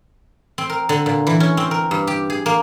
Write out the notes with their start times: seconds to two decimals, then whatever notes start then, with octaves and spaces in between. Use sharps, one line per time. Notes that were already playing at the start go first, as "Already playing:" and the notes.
0.58 C4
0.70 A#4
0.89 D3
1.06 A#2
1.27 E3
1.40 C#4
1.57 C4
1.71 A#4
1.91 G2
2.07 G4
2.30 G#4
2.46 A#3